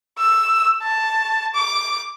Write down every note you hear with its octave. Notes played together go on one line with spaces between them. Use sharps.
E6
A5
D6